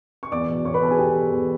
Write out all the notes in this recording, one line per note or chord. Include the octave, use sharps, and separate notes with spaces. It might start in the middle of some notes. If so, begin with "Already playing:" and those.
C#6
E2 D5 D6
B2
E2 C#5 C#6
B4 B5
B2 A4 A5
G#4 G#5
E2 G4 G5
B2
E2